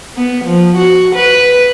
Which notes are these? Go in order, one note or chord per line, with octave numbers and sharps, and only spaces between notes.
B3
F3
F#4
B4